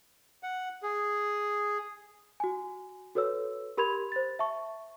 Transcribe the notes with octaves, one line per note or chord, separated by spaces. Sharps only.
F#5
G#4
F#4 G#5
F#4 A4 B4 C#5 E6
G4 A#4 B5 C6 G#6 F7
C5 A6
E5 A5 C#6